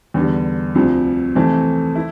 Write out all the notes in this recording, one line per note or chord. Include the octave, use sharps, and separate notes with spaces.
E2 D3 G3
D2 C3 F3
F2 C3 E3 A3 C4
E4